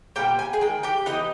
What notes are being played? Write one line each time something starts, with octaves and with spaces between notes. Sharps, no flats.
A#2 G3 B3 G4 G5
G#5
G#4 G#5
D#3 G#3 G5
G4 G5
E3 G3 B3 D#4 D#5